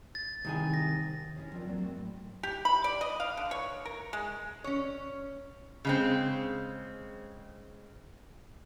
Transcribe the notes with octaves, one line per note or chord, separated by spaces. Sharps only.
A6
C2 D#3 G#4
A#6
C#4 E4 G#4 C#5
F3 C4 D4 F4 A#4 D5
F#3 A#3 C4 D5
A3 C4 D4 F#4 G#4
A2
G4
B5
D5
D#5
F5
D3
C#5
A#4
G#3
C#4 C#5
C#3 G#3 C4